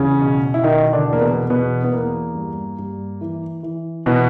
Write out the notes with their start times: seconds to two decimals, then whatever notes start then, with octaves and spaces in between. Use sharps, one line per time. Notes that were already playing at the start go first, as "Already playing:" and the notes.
Already playing: E2 C#3 C#4
0.21 B2
0.54 E4
0.63 B2 D#3 D#4
0.93 D3 D4
1.07 E2
1.13 A#3
1.21 B2 B3
1.50 E2 B2 B3
1.84 B3
1.92 E2 A#3
2.35 G2
2.79 G2
3.21 E3
3.63 E3
4.06 B2 E3 B3